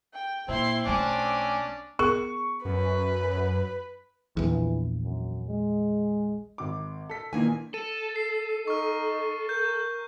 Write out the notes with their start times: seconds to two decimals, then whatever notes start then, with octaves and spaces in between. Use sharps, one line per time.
0.13 G5
0.48 A#2 C4 E4 C6
0.86 B1 A3 C#4 D4 D6
1.99 B3 G#4 A#4 C#6
2.65 F#2 B4
4.37 A#1 E2 E3
5.04 F#2
5.48 G#3
6.58 G#1 D6
7.09 A4 B6
7.33 A#2 D#3 E3 A#3 G#5
7.74 A4 D#7
8.16 C7
8.68 D#4 C#6 F6
9.49 A#4 G6